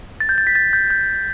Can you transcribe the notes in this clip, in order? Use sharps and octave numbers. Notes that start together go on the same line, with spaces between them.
A6
G6
A6
B6
A6
G6
G6